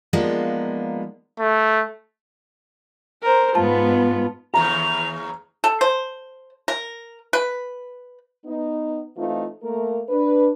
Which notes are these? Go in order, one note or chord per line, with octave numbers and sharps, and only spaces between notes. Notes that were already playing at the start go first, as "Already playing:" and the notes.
F3 G#3 A#3 B3 D4 D#4
A3
A#4 C5
G#2 B3 F4 A5
D#2 C#3 A3 A#5 F7
A4
C5
A#4
B4
B3 D#4
E3 A3 C4 D#4 F4
A3 A#3 A#4
D4 B4